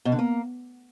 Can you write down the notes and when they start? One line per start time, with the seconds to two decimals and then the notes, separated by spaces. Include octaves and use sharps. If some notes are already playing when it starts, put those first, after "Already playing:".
0.05 B2
0.12 D3
0.19 A#3